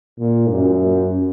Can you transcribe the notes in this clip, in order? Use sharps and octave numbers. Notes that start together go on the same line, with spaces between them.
A#2
F#2